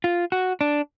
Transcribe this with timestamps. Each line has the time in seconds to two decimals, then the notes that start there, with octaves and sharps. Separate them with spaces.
0.04 F4
0.32 F#4
0.61 D4